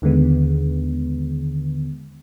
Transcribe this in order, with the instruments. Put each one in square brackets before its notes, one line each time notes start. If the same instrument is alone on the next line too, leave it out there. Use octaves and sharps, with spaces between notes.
[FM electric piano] D#2 D3 D#3 G#3 B3